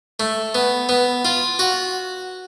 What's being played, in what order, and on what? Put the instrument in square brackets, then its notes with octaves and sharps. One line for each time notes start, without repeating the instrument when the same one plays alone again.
[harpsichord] A3
B3
B3
F4
F#4